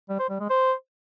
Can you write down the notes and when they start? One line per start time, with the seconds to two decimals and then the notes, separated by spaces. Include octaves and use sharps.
0.09 G3
0.19 C5
0.29 G3
0.40 G#3
0.50 C5